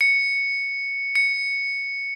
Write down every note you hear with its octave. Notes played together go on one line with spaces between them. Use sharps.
C#7
C#7